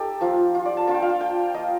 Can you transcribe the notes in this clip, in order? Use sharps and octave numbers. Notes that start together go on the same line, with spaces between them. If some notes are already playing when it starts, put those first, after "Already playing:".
Already playing: D#4 G4 A4
F3 A#3 F4
F4
D5
A5
A#3 D4 F4 A5
G5
F5
G5
G5
A#3 F4 D#5